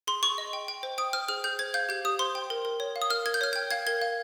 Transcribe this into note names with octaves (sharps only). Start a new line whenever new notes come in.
G#4 C6
G#4 C#6
D#5
G5
G5
C5
G5 D#6
C5 F6
G#4 F6
G#4 G6
C5 G#6
F5 G6
G4 G6
G4 D#6
C5 C6
G5
A#4
A#4
C#5
F5
D#6
A#4 F6
A#4 G#6
G6
C#5 F6
G5 G6
F5 G#6
A#4 G#6
F5